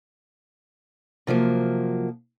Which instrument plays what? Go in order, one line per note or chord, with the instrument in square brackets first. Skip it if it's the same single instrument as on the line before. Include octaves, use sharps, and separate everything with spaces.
[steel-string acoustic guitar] C3 F3 F#3 A#3